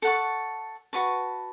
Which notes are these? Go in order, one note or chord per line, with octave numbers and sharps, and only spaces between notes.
A4 F#5 A5 C#6
F#4 B4 A5 C#6